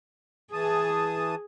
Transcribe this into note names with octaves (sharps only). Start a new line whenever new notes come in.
E3 G#4 A5 D#6